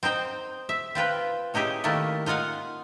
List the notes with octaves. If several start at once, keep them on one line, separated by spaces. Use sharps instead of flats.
C4 D#4 C5 G5
E5
C4 F4 B4 G5
C#4 D#4 E4 G4 G#4
D#3 A3 A#3 E4 A4
D#4 F4 F5 F#5 G#5